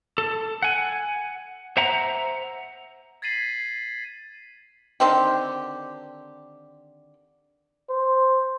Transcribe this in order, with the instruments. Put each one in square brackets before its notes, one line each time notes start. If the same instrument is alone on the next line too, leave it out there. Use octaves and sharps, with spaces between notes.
[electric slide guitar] A4
F#5 G#5
C5 E5 F#5 A#5
[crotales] G#6 A6 B6 C7 D#7 F#7
[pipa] D3 D#3 C4 G4
[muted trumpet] C5